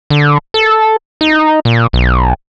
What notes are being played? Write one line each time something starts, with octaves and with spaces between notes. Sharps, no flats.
D3
A4
D#4
A#2
B1